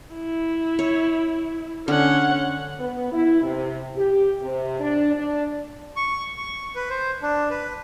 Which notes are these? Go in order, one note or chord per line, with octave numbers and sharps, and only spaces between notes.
E4
C#5
D3 C#4 F#5
B3
E4
C3
G4
C3
D4
D4
C#6
C#6
B4
C5
D4
B4